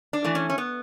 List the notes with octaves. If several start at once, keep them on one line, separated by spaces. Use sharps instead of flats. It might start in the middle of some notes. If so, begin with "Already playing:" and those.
D4
E3 A3
C#4
C#4
B3